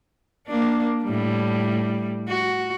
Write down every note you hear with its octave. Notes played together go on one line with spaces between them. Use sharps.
A#3 D4
A2 G3
F#4